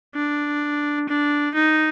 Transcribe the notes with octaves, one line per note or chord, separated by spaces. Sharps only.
D4
D4
D#4